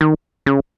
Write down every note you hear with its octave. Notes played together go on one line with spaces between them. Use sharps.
D#3
C#3